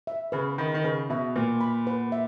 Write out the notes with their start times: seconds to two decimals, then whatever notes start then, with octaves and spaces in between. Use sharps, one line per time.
0.07 E5
0.32 C#3 B4
0.58 D#3 B5
0.74 D#3
0.84 C#3 B4
1.10 B2 E5
1.36 A#2 B4
1.61 B5
1.87 B4
2.12 E5